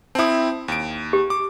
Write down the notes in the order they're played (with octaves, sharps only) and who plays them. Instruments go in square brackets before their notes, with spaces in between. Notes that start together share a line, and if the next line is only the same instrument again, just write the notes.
[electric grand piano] C4 E4 [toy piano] A5 D#6
[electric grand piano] D#2 D7
[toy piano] G4
[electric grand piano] D6